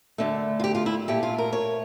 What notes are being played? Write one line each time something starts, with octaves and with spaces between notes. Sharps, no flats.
D2 D3 A3
F4
G4
F4
E4
A#2 A3 G4
F4
A#4
C#5